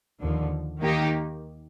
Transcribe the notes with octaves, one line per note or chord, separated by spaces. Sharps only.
D#2 D3 F3
D#2 D#3 A#3 D#4 G4